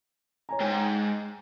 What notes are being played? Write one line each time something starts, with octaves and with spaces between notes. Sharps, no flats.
C#5 G#5 A#5
G#2 G5 G#5